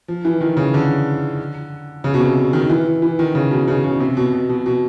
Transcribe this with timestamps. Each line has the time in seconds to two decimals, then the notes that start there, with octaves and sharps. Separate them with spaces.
0.08 F3
0.25 E3
0.41 D#3
0.57 C#3
0.74 D3
2.04 C#3
2.14 B2
2.20 C3
2.53 D#3
2.69 E3
3.02 E3
3.19 D#3
3.35 C#3
3.51 B2
3.68 C#3
3.84 C#3
4.00 C3
4.17 B2
4.33 B2
4.49 B2
4.66 B2